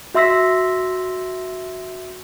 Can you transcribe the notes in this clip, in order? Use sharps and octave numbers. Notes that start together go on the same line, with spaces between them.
F#4 E5 C6 E6 A#6 B6